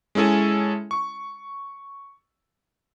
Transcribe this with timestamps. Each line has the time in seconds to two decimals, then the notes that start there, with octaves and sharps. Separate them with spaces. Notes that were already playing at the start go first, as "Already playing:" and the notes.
0.15 G#3 C#4 E4 A4 G#5
0.91 C#6